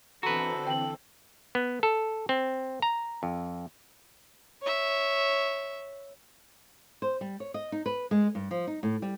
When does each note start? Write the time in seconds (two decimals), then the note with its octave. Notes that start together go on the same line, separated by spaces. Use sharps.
0.23 D3 E3 C4 F#4 A4 B4 A#5
0.67 G5 F#7
1.55 B3
1.83 A4
2.29 C4
2.82 A#5
3.23 F2
4.62 C#5 E5
7.02 C5
7.21 G3
7.40 C#5
7.54 D#5
7.72 D#4
7.86 B4
8.11 G#3
8.35 G2
8.51 F3
8.67 D#4
8.83 A2
9.02 G3